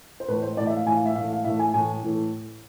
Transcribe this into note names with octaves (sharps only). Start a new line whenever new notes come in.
C5
A2 E3 A3 B4
C5
A2 E3 A3 D5
E5
F5
A2 E3 A3 G#5
F5
E5
A2 E3 A3 F5
F5
A2 E3 A3 E5
G#5
A2 E3 A3 G#5
A2 E3 A3